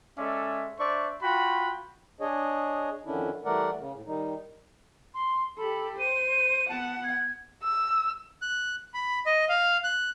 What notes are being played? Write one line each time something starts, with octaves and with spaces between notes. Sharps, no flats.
G#3 C#4 A4 D5 E5
D4 C5 D5 E5 C#6
F4 F#4 G5 B5
D4 G#4 C#5 D#5
F2 D3 D#3 C#4 D4 E4
E3 G3 A3 A#4 D5 F#5
C#3
A2
D#3 G3 D#4
C6
G4 A4 B5
C5 D#7
B3 F#5 A5
G#6
E6
F#6
B5
D#5
F5
F#6